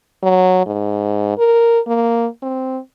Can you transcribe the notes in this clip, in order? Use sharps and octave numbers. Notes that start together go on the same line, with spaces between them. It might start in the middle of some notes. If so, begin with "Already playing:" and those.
F#3
G#2
A#4
A#3
C4